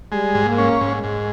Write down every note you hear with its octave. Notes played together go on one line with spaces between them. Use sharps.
G3 G#3
G#2
A#3
C#4
G#2 G#3
G#2